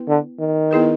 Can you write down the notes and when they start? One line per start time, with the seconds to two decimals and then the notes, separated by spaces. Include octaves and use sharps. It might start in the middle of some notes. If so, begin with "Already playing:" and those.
Already playing: B3 E4 B4
0.08 D3
0.39 D#3
0.71 B3 E4 G#4 B4